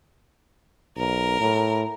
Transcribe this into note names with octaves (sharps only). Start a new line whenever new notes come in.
B1 A#4
A2